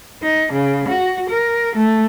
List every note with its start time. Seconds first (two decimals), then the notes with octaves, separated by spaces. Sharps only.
0.22 D#4
0.53 C#3
0.88 F#4
1.29 A#4
1.76 A3